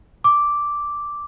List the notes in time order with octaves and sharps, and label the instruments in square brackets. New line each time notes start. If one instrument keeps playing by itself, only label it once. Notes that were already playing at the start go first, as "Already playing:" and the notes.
[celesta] D6